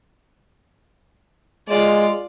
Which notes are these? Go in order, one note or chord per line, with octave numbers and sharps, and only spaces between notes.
G#3 F4 D5